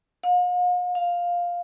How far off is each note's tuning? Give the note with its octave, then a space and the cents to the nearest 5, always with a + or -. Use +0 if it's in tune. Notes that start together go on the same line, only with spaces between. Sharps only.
F5 +45
F5 +5